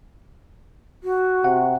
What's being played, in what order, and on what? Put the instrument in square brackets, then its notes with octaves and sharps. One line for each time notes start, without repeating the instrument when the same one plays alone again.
[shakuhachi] F#4
[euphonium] C3 [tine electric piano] F#5